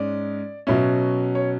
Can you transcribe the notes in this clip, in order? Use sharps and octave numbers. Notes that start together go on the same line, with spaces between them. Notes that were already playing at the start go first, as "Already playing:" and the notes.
Already playing: G#2 G#3 C#4 D5
B2 F#3 C#4 E5
C#5